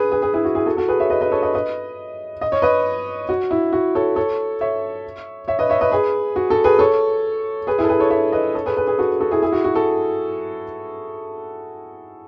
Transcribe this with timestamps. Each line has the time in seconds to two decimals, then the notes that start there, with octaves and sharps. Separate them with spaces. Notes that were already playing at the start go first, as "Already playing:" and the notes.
Already playing: G#4 B4
0.12 G#4 B4
0.22 G#4 B4
0.34 E4 G#4
0.45 F#4
0.55 E4 G#4
0.66 F#4 A4
0.77 F#4 A4
0.88 G#4 B4
0.99 C#5 E5
1.10 B4 D#5
1.21 B4 D#5
1.32 A4 C#5
1.42 B4 D#5
1.55 B4 D#5
2.41 D#5
2.52 C#5
2.62 B4 D#5
3.29 F#4
3.51 E4
3.73 F#4
3.95 A4 C#5
4.16 A4 C#5
4.61 C#5 E5
5.48 C#5 E5
5.59 B4 D#5
5.70 C#5 E5
5.81 B4 D#5
5.91 G#4 B4
6.36 F#4
6.50 F#4 A4
6.64 G#4 B4
6.79 A4 C#5
7.67 G#4 B4
7.78 E4 G#4
7.84 A4
7.89 G#4 B4
8.00 A4 C#5
8.10 C#5 E5
8.32 B4 D#5
8.54 A4 C#5
8.66 G#4 B4
8.77 G#4 B4
8.87 G#4 B4
8.98 F#4 A4
9.20 F#4 A4
9.31 E4 G#4
9.42 E4 G#4
9.52 F#4
9.64 F#4
9.75 F#4 A4